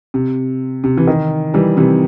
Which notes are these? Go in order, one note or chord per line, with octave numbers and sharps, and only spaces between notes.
C3
C3
E3
D#3
E3 G3
C3 E3